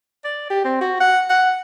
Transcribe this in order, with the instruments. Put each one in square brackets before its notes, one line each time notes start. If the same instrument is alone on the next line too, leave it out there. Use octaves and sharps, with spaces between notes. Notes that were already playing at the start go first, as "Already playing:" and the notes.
[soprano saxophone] D5
G4
C4
F#4
F#5
F#5